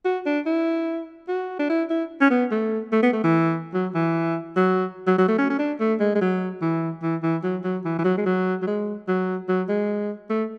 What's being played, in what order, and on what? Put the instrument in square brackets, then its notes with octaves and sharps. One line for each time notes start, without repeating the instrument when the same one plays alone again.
[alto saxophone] F#4
D4
E4
F#4
D4
E4
E4
C#4
B3
A3
A3
B3
A3
E3
F#3
E3
F#3
F#3
F#3
A3
C#4
C#4
D4
A3
G#3
G#3
F#3
E3
E3
E3
F#3
F#3
E3
E3
F#3
G#3
F#3
F#3
G#3
F#3
F#3
G#3
A3